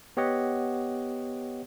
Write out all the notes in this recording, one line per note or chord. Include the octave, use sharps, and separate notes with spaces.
B3 G4 C#5 D#5 F#5